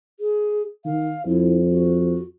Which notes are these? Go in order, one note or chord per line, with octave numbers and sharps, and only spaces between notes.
G#4
D#3 F5
F2 E4
F#4